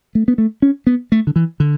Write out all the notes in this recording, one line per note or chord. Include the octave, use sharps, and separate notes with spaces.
A3
B3
A3
C#4
B3
A3
D3
E3
D3